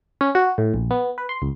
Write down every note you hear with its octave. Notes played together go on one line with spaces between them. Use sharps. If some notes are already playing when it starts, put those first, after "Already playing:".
C#4
F#4
A2
A#1
B3
B4
C6
C#2